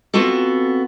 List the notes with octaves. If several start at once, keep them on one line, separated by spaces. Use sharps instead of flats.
B3 C4 F4 F#4 A4